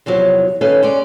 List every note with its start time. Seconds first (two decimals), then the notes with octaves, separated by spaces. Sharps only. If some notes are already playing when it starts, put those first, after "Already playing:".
0.06 E2 C3 F3 F#3
0.61 D#3 C#4 A4 B4 F5
0.83 G#3 C#4 D5